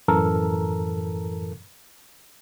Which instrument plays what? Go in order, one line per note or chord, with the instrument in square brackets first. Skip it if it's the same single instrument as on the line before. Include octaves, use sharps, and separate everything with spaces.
[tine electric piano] F#2 A2 E3 A4 A#4 A#5